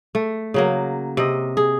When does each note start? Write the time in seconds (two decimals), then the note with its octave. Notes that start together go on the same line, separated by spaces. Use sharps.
0.15 A3
0.54 C#3 F#3 A#3
1.17 C3 D#5
1.57 G#4